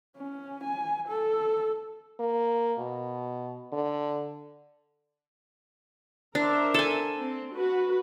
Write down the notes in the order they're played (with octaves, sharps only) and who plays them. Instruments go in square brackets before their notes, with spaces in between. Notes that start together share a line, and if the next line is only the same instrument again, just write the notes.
[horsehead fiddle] C#4
G#5
A4
[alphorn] A#3
B2
D3
[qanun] D4 [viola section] A#4 C5 E5
[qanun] A4 G#5
[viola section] C4
F#4 B4